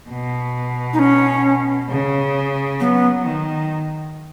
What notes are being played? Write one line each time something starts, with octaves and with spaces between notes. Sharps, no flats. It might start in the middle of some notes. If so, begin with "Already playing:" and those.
B2
D#4
C#4
C#3
F#3 B3
D#3